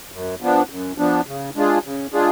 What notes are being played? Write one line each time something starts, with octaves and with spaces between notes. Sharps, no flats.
F#2
F3 B3 D4
F#2
F3 B3 D4
C#3
G#3 D4 F4 G#4
C#3
G#3 D4 F4 G#4